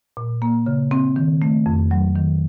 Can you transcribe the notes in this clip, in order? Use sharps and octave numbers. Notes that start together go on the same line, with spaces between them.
A#2
A#3
C#3
C4
D#3
A3
F2
F#3
D#3